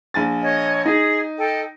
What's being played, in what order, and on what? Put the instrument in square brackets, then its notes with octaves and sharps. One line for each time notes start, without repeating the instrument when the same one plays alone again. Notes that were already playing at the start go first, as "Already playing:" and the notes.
[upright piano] A#1 G#5 A6
[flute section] C#5 D#5
[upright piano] D#4 [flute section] G#4
[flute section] A4 D#5 G5